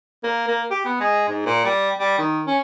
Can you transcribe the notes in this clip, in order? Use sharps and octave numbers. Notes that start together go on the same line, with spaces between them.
A#3
A#3
G4
B3
G#3
G#2
A#2
G3
G3
D#3
C#4